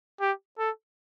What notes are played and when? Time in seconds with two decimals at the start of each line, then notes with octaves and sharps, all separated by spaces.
0.20 G4
0.59 A4